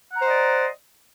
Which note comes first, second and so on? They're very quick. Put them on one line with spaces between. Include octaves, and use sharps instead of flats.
F#5 A#5 C5 D#5 D5